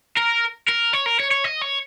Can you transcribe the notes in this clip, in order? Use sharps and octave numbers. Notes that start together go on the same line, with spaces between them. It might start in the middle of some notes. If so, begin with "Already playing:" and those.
A#4
A#4
C#5
A#4
C#5
C#5
D#5
C#5